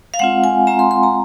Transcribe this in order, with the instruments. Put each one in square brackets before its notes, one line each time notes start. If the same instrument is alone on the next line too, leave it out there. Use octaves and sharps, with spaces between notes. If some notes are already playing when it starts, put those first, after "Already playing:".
[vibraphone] F5
G#3 C4 F4 F#5
G#5
G#3 C4 F4 A#5
C6
C6
A#5